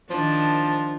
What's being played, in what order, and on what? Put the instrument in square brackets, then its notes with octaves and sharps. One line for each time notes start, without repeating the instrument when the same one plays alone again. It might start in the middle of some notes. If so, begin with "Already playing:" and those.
[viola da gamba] D#3 D4 [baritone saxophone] F3